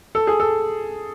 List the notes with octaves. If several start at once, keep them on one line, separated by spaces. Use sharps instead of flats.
A4
G#4
A4